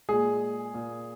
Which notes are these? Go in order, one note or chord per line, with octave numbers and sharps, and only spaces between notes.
A#2 G#3 G#4
A#2 A#3